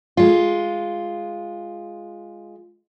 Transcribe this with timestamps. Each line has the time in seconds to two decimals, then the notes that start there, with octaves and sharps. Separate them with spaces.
0.17 G#3 F4